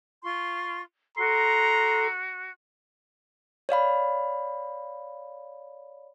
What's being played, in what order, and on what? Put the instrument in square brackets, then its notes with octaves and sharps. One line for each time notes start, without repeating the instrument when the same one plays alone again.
[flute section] F4 C6 C#6
[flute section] F#4 [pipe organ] A4 [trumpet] A#5 [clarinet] C6
[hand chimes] C#5 D5 F5 B5